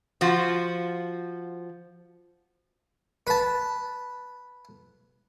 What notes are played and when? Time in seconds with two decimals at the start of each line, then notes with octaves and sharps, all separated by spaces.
0.21 F3 F4 F#4
3.27 B4 A5